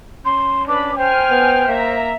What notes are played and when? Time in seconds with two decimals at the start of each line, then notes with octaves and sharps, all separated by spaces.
0.25 C#4 C6
0.68 D4 B4 B5 D6
0.97 C5 G5 G#5 F6
1.31 B3
1.68 A#3 E5 A#5